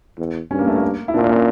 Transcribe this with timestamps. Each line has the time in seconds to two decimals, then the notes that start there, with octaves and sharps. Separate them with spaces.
0.19 E2
0.51 G2 C#4
0.59 A#3
0.67 A3
0.76 A#3
1.08 E4
1.14 A#2 D4
1.24 A#3
1.30 C#4